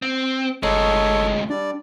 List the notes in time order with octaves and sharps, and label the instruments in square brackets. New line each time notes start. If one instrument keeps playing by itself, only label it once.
[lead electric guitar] C4
[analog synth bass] G1 [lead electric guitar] D2 G#3 [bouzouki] D#4 [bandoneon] A4 C#5
[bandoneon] G3 D5 [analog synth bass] D4